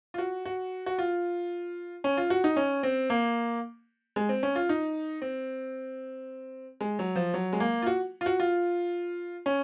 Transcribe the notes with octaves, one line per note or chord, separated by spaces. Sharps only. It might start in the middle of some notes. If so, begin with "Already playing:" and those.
F4
F#4
F#4
F#4
F4
C#4
F4
F#4
D#4
C#4
C4
A#3
G#3
C4
C#4
F4
D#4
C4
G#3
F#3
F3
F#3
G#3
A#3
F4
F#4
F4
F#4
F4
C#4